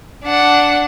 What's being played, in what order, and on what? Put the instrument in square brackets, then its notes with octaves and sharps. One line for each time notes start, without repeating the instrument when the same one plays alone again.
[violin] D4 F#5